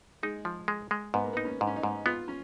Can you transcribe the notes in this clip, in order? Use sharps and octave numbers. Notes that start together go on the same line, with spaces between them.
G#3 D#4
F3
G#3
G#3
G#2 B3
A#3
B3 D#4
C#4
G#2
C#4
D#4
G#2
B3 F4
C#4